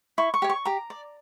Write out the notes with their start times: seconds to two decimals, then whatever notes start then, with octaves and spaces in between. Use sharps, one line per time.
0.18 E4 C#6
0.34 C#6
0.42 G4 C#5
0.49 C#6
0.65 G4 A#5
0.90 D5